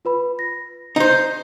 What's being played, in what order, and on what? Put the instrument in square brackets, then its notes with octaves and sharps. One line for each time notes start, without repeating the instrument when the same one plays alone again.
[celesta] F4 B4 B5
A#6
[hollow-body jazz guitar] D#4 C5